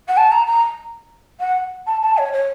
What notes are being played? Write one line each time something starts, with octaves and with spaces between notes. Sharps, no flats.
F#5
A5
A#5
A#5
F#5
A5
A5
C#5
C#5